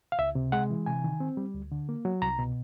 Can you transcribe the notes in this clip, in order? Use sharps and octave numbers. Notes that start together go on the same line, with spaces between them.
F5
C#2 E5
C3
G#3 F#5
E3
C3 G#5
D#3
C4
G3
D2
D3
A#3
F#3
C2 A#5
B2